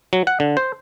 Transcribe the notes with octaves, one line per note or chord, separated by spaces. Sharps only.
F#3
F#5
D3
C5